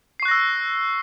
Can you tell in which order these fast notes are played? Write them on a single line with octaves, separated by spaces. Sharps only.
C7 C#6 F#6 A#6 E6